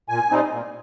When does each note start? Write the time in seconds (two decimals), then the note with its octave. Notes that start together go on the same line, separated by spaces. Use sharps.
0.09 A#2 G#5
0.30 G3 C4 D#4
0.52 A#2